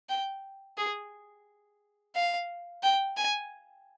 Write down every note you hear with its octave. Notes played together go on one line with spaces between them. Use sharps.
G5
G#4
F5
G5
G#5